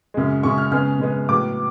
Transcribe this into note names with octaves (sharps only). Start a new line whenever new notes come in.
F#2 C#3 G#3
F#2 C#3 G#3 C#6
F6
C#3 G#3 B3 F6
C#3 G#3 B3
A2 F#3 B3 D6